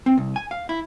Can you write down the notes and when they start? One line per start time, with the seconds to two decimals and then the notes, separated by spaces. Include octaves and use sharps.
0.06 C4
0.18 C2
0.36 G#5
0.51 F5
0.69 E4